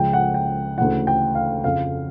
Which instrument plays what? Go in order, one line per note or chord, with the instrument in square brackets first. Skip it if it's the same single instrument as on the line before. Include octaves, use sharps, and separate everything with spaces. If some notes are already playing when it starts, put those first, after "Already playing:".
Already playing: [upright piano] C#2 C#3 F3 G5
F#5
G5
D2 C#3 E3 F#5
G5
F5
F2 C#3 F3 F5